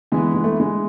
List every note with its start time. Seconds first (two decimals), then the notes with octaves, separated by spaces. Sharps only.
0.12 E3 G#3 B3 E4
0.35 G#3
0.44 A3
0.60 G#3